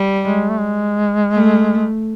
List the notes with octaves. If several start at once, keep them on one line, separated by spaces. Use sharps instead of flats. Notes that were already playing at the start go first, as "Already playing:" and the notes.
Already playing: G3
G#3
A3
G#3
A3